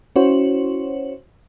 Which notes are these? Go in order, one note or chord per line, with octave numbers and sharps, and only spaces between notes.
C#4 E4 F#4 C5 C#5